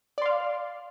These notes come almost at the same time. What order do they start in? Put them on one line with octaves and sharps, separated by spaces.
D5 C6 F5